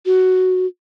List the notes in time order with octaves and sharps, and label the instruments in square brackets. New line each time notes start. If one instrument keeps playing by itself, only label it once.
[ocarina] F#4